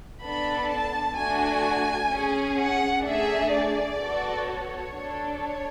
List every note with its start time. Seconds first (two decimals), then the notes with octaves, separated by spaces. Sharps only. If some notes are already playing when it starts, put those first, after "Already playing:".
0.23 B3 D4 A4 B5
0.70 A5
1.17 A3 D4 F#4 G#5
2.11 C#4 G#4
2.59 F#5
3.05 A3 D4 G#4 E5
3.52 D5
3.99 B3 F#4 A4
4.46 C#5
4.93 D4 A4
5.40 C#5